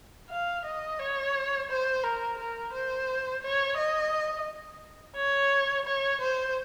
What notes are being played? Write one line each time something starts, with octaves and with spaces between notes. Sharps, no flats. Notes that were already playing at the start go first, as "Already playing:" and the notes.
F5
D#5
C#5
C5
A#4
A#4
C5
C#5
D#5
C#5
C#5
C5